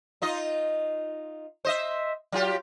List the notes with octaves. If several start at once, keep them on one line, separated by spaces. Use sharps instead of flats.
D#4 F4 D#5
C5 D#5 E5
F#3 F4 G4